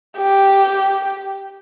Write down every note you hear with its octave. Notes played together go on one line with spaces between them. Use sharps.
G4